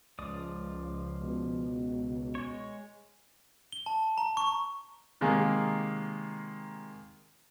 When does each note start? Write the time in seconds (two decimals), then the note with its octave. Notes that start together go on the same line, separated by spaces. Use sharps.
0.19 C#2 F3 D5 D#6
1.22 B2
2.35 G#3 C#5
3.72 G7
3.86 A5
4.18 A#5
4.37 C#6
5.21 C3 D#3 G#3 A#3 G#4 A#4